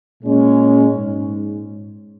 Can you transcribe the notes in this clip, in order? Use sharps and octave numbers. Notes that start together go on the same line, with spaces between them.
A#2 G#3 C#4
G#2